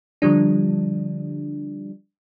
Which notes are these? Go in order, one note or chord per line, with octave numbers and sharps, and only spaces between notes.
D3 F3 G3 D4